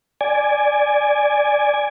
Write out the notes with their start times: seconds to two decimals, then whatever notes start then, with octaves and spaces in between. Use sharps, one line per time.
0.21 D5 G#5